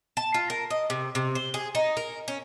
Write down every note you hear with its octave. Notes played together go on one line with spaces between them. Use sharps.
A5
F4
A#4
D#5
C3
C3
C5
G#4
D#4
A#4
C#4